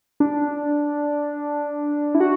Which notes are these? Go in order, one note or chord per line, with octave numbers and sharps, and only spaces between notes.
D4
E4
F#4